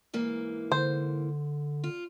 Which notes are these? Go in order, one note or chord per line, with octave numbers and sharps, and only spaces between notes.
G#2 E3 A#3
D3 C5
F4